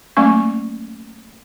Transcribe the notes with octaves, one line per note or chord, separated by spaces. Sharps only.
F#3 A3 A#3 C#4 C#6